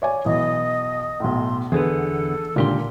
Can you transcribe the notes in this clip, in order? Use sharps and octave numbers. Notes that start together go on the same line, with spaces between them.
C#5 D5 G#5
B1 E3 D#5 D#6
B1 A2 C6
E2 D3 B3 G#4 A4 B4
C#2 A#2 D3 G4 A#4 C6